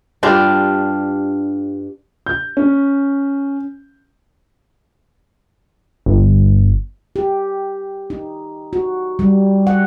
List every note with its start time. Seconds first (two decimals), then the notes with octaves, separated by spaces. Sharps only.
0.23 G2 D4 F4 G4
2.26 G6
2.57 C#4
6.06 G1
7.16 G4
8.10 D#4
8.73 F#4
9.19 G3
9.67 F#5